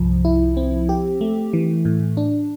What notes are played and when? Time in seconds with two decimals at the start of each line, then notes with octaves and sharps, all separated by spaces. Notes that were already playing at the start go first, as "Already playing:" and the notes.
Already playing: C2 G2 F3
0.25 E4
0.57 C4
0.89 G4
1.21 A3
1.53 E3
1.85 A2
2.17 D4